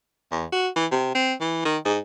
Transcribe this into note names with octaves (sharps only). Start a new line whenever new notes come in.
E2
F#4
E3
C3
C4
E3
D#3
G#2